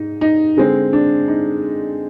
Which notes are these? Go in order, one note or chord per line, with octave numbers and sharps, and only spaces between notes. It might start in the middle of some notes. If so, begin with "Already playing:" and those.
Already playing: G#2 D#4
D#4
D3 G#3 C4
D4
D#4